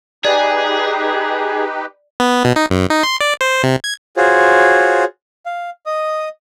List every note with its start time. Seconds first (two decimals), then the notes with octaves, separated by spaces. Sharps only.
0.25 D#4 G4 G#4 B4 D5
2.20 B3
2.45 B2
2.56 D#4
2.70 F#2
2.90 D#4
3.03 C6
3.21 D5
3.41 C5
3.63 C3
3.84 G#6
4.17 F4 F#4 G#4 C5 C#5
5.46 F5
5.86 D#5 D#6